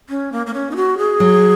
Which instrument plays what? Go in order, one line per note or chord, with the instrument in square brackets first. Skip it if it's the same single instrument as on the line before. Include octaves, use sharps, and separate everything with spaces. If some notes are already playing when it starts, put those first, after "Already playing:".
[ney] C#4
A#3
A#3
C#4
D#4
F#4
G#4
[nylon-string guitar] F#3